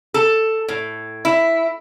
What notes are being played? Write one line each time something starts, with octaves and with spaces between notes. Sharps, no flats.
A4
A2
E4